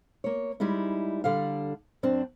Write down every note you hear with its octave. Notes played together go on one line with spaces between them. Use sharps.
A#3 C#5
G3 G#3 D#4 E4
D3 G3 A4 F5
F#2 C4 D4